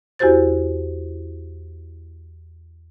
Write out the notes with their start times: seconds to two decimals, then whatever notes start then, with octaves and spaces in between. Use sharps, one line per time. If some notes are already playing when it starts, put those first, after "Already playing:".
0.19 E2 E4 F#4 G4 C5 A6